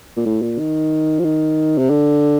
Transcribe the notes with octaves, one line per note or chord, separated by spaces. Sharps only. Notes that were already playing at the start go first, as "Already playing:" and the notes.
A#2
A2
A#2
D#3
F3
D#3
C3
D3